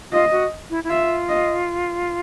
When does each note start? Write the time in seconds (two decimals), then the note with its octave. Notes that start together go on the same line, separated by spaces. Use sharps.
0.12 F4 D#5
0.31 F#4
0.70 E4
0.84 E4
0.90 F4 E5
1.29 D#5